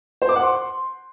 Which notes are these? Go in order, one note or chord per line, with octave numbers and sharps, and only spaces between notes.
C5
D6
F#5
C6